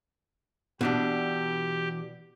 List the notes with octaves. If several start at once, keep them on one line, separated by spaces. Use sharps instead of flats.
B2 E3 D4 G4